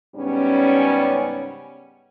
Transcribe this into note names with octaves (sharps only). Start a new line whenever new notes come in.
G#2 C#3 G3 B3 C#4